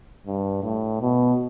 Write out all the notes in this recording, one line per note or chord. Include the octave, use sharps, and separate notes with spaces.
G2
A2
B2